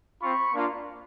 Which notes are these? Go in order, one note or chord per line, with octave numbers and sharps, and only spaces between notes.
C4 F4 B5 C#6
A#3 D4 F4